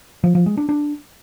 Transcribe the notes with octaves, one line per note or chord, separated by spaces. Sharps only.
F3
F3
G#3
D4
D4